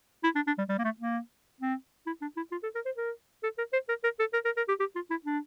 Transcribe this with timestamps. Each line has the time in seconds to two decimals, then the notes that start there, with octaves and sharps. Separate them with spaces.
0.24 E4
0.35 D4
0.47 D4
0.58 G3
0.69 G3
0.78 A#3
0.84 A3
1.00 A#3
1.61 C4
2.07 E4
2.22 D4
2.37 E4
2.52 F4
2.63 A4
2.75 A#4
2.86 C5
2.97 A#4
3.43 A4
3.58 A#4
3.73 C5
3.89 A#4
4.04 A#4
4.19 A4
4.33 A#4
4.45 A#4
4.57 A#4
4.68 G4
4.80 G4
4.95 F4
5.10 E4
5.25 D4